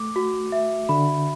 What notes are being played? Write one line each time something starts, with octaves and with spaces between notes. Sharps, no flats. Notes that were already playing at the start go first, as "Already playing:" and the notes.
Already playing: A3 D6
F#4
E5
D3 B5